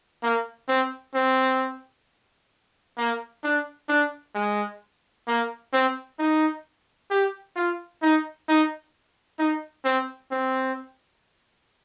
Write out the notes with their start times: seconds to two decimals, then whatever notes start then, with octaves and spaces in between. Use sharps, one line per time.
0.23 A#3
0.68 C4
1.15 C4
2.98 A#3
3.43 D4
3.89 D4
4.35 G#3
5.27 A#3
5.73 C4
6.19 D#4
7.10 G4
7.56 F4
8.02 D#4
8.48 D#4
9.39 D#4
9.84 C4
10.31 C4